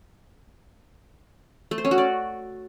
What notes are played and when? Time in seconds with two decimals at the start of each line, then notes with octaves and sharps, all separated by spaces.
1.71 A3
1.78 C5
1.85 C#4
1.91 F#4
1.98 D5